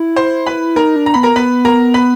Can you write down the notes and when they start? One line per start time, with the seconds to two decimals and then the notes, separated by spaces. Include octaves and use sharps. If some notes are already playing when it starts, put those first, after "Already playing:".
Already playing: E4
0.16 C5 C6
0.46 B4 B5
0.76 D#4 A#4 A#5
0.96 D4
1.06 A#5
1.14 B3 B5
1.23 A#4 A#5
1.35 B3 B4 B5
1.65 A#4 A#5
1.94 B4 B5